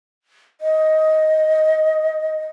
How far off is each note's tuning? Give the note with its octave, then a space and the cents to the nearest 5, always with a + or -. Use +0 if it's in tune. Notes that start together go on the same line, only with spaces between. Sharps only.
D#5 +10